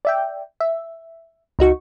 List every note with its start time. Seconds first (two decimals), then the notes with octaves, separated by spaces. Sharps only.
0.05 D5 E5 G5
0.60 E5
1.59 C#2 D#4 F#4 C#6